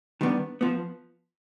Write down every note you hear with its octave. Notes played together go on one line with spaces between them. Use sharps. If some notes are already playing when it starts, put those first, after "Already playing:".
D#3 G3 B3 D4
F3 B3